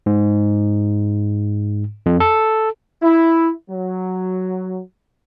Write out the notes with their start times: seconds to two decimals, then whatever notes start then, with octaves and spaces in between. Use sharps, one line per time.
0.06 G#2
2.06 F2
2.20 A4
3.03 E4
3.70 F#3